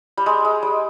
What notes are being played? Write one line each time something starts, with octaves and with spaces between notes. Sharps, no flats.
G3
G#3
G#3
G3